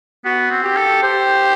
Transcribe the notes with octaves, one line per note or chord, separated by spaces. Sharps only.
B3 F#4
C4
G4
A4
G4 C5